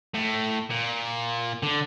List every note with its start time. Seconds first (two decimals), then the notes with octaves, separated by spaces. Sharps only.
0.14 A2
0.70 A#2
1.63 D3